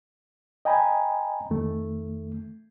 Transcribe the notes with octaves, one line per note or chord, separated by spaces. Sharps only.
D#5 G5 G#5 A#5 B5
F2 D#3 A3